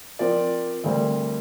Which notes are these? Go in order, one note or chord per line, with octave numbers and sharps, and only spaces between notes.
F3 C4 A#4 D5
D2 D3 G3 C4 A#4